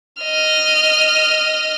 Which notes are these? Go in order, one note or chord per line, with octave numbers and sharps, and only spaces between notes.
D#5 F6